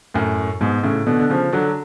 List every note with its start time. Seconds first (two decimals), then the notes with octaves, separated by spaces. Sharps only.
0.14 F#2 A2
0.61 G#2 B2
0.83 A2 C#3
1.07 B2 D3
1.19 D3
1.30 C#3 F3
1.52 D3 F#3